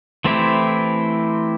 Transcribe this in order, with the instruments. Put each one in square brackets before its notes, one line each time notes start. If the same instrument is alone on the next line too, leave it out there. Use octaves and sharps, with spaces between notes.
[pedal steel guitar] E3 A3 C4 E4 G4